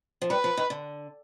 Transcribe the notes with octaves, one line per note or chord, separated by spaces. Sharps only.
F3
G3 B4
F3
D#3
D3